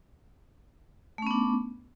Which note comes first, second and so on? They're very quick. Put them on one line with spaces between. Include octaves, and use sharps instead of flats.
A3 C#4 B3 D4